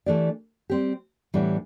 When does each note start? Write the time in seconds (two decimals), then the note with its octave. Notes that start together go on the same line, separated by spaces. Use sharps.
0.06 E3 A3 D4 G4 D5
0.70 G3 C4 G4
1.34 A2 E3 G3 B3 D4